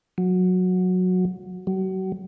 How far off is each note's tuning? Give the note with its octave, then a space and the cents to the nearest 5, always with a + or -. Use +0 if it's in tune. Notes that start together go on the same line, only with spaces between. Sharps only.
F#3 -15
F#3 +35